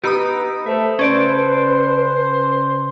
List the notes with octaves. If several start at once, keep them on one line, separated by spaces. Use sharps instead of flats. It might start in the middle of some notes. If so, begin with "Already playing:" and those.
B3 D#4 G4 B4 B5 D#6 E6
A3 C5 E5
C#3 C#4 A4 B4 C5 D5 D7